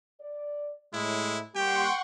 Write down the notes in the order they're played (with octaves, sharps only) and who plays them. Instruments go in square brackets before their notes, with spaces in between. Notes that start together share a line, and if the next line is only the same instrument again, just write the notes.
[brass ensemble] D5
[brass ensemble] A2 [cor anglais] G#3 [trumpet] E4
[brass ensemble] G3 A#3 [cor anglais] G4 [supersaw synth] F#5 C6 C#6 [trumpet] G5